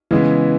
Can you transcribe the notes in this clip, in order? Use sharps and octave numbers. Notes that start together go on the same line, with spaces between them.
C#3 E3 G#3 B3